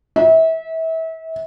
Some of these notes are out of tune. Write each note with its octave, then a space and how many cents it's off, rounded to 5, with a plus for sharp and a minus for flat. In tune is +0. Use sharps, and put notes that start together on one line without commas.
E5 -30